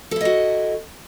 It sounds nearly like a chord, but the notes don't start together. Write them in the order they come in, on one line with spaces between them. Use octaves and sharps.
A4 E4 D#5 F#4